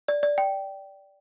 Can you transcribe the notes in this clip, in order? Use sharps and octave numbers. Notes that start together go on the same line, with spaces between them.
D5
D5
G5